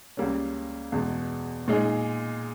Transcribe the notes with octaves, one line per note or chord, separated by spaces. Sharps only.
C#2 C#3 G3 A#3 C#4
E2 B2 G#3
A#2 G#3 D#4 G#4